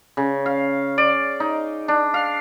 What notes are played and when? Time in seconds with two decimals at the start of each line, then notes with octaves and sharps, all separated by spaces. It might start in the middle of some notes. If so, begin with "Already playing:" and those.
0.17 C#3
0.46 F5
0.98 D5
1.40 D#4
1.88 D4
2.14 F5